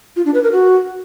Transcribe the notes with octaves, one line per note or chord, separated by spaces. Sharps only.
F4
D4
B4
A#4
F#4